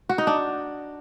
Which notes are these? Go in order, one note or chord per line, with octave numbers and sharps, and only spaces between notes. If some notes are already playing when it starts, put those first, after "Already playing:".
F#4
D#4
D4